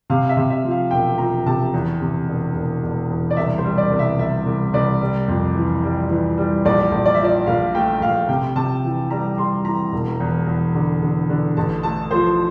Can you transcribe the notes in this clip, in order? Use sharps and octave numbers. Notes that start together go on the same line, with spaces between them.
C3 F5
E5
C3
E5
F3
F5
E1 G5
F3 A#5
C3 A5
E2
C3
E1
E1
E1
E2
D5
C2 E5
C5
G3
D5
C2
E5
C2 E5
C2
C2 D5
G3
F2
E3
G3
E3
G3
A#1 D5
A#1
D5
E5
F3 D5
A#1 F5
A3 G5
A#1 F5
C3 G5
C3 A5
E3
G3 A#5
G3 C6
E3 A#5
E1
E2
E2
D3
D3
D3
A1 A5
A3 A5
F3 C5